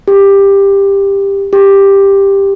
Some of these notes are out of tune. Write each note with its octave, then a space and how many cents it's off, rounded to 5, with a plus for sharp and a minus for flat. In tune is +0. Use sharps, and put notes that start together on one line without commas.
G4 +15
G4 +10